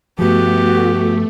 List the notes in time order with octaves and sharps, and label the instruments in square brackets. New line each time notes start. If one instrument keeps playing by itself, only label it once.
[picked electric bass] G2 F3 [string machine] A3 [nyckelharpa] B3 G4 [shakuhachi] F#4